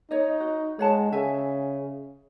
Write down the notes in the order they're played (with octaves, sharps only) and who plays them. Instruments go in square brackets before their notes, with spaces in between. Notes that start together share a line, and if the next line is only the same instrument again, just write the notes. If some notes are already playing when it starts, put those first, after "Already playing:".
[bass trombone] D#4 [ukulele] C#5 D#5
[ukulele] F#4
[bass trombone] G#3 [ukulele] C#5 F#5 A5
[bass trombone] C#3 [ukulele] E5 G#5